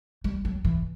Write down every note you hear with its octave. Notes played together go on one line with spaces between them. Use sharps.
G3
F#3
E3